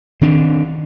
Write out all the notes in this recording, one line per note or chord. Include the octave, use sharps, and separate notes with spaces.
D#3 C4 D4